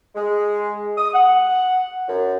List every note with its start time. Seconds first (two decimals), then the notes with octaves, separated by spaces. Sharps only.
0.15 G#3
0.97 D#6
1.13 F#5
2.08 F#2